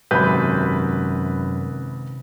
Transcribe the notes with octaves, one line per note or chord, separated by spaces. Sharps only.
G#1 F#2 C3 B4 B5 G6